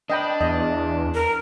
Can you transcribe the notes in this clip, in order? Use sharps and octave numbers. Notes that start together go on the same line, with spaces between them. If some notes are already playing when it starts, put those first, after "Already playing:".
D4 D#5 G5 B5
E2 D#5
A#4